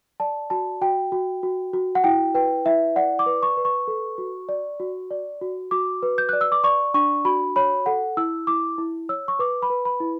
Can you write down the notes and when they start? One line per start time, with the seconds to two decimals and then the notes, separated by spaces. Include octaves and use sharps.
0.20 D5 A5
0.50 F#4 A5
0.82 F#4 G5
1.12 F#4
1.43 F#4
1.73 F#4
1.95 F#5
2.04 E4 G5
2.34 B4 G5
2.65 E4 E5
2.96 D5 F#5
3.19 D6
3.26 B4
3.43 C#6
3.57 B4
3.65 C#6
3.88 A4
4.18 F#4
4.49 D5
4.80 F#4
5.11 D5
5.41 F#4
5.71 F#4 D6
6.03 B4
6.18 G6
6.29 D5 F#6
6.41 E6
6.52 D6
6.64 D5 C#6
6.94 D4 C#6
7.25 F#4 B5
7.56 C#5 B5
7.86 A4 F#5
8.17 E4 E6
8.47 E4 D6
8.78 E4
9.09 C#5 E6
9.28 C#6
9.39 B4 D6
9.62 B5
9.70 B4
9.85 B5
10.00 E4